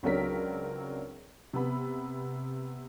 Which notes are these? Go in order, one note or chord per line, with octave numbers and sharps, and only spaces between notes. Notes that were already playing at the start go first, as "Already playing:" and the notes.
C#2 F#3 C4 D4 A#4 B6
C3 B3 B5